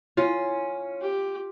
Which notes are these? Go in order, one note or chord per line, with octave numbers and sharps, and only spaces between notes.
C#4 F4
G4